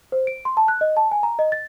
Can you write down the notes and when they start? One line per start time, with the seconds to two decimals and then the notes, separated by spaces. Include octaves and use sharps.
0.12 C5
0.27 D7
0.45 C6
0.57 A5
0.68 F#6
0.81 D#5
0.97 A5
1.11 G#5
1.23 A#5
1.39 D#5
1.52 A6